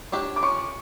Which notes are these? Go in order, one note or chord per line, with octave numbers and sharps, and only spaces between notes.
D4 G4 C#5
D6
C#4 C#6